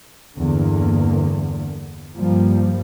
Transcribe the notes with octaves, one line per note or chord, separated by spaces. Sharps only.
E2 G2 D3 A#3
G2 F3 G3 A#3